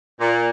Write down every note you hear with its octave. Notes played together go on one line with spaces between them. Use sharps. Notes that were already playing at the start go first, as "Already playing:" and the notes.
A#2